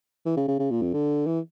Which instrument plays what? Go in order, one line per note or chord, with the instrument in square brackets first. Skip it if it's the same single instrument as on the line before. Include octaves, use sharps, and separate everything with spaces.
[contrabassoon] E3
C#3
C#3
C#3
A#2
F2
D3
E3